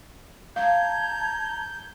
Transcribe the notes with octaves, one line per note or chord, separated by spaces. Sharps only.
F5 A5 A#5 G6 G#6